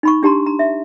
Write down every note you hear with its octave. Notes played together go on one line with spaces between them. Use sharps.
D#4 B5 C#6
D4 G4 A5 A#5 C6
A#5
E5